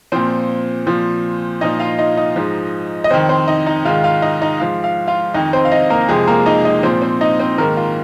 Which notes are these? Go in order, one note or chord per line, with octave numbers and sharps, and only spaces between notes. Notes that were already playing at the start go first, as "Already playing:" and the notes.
A#2 F3 C4 C5
A#2 F3
A#2 F3 D#4 D#5
F4 F5
D#4 D#5
D#4 D#5
G#2 F3
D#5
F2 D#3 C4 C5
C4 C5
D#4 D#5
D#4 D#5
G#2 D#3 F4 F5
F4 F5
D#4 D#5
D#4 D#5
G#2 F3 F5
F5
F4 F5
F2 D#3 D#4 D#5
C4 C5
F5
D#4 D#5
A#3 A#4
F2 C3 F3 G#3 G#4
A#3 A#4
D#4 D#5
D#4 D#5
A#2 F3 C4 C5
C4 C5
D#4 D#5
C4 C5
G#2 D#3 A#3 A#4
F4